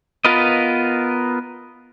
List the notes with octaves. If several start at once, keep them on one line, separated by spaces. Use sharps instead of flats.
B3 F4 A#4 B4 D#5